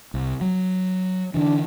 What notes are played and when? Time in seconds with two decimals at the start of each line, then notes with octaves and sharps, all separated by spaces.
0.14 C2
0.41 F#3
1.34 D3 E3 D4